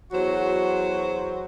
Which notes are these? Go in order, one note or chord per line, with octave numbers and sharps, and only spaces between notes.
E2 F#3 F#4 C5